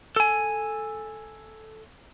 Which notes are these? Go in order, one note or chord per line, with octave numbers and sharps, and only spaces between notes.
A4 G#5